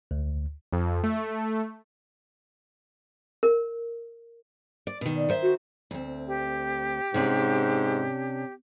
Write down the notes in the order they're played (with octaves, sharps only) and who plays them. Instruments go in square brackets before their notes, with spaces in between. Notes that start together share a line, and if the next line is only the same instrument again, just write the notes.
[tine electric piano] D2
[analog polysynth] F2
A3
[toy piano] A#4
[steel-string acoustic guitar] D5
B2 D#3
[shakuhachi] D5
[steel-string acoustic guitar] D#3 C5 E5
[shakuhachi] F#4
[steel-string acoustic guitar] D2 C4
[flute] G4
[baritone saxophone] G#2 [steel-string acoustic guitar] C3 C#4 D4